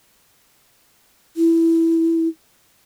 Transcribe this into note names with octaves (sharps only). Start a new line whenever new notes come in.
E4